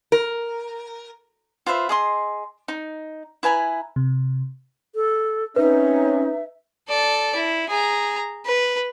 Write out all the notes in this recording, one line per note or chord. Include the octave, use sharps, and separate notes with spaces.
A#4
F4 B4 C5 E5
G#4 D#5 C6
D#4
E4 B4 G#5 A#5
C3
A4
C4 C#4 D#4 B4 E5
A4 D5
E4
G#4 A#5
B4